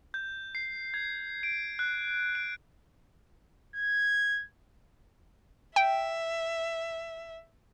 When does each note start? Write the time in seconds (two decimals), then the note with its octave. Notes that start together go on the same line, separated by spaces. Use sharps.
0.14 G6
0.55 C7
0.94 G#6
1.43 D7
1.79 F#6
2.35 D7
3.75 G#6
5.76 E5 G5